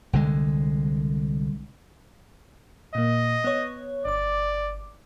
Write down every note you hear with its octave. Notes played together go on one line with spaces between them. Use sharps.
C2 D3 G#3
A#2 A#3 D#5
B3 C#5
G1 D5 D6